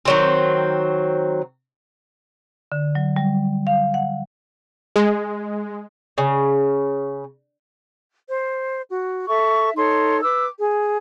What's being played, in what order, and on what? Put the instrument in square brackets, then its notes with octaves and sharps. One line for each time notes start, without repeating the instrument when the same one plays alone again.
[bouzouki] D#3 F#3 C4
[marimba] D3
F#3
G3
F5
F#5
[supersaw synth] G#3
[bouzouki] C#3
[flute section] C5
F#4
A4 E5 C#6
D#4 A4 C#5 C6
B4 D6 E6
G#4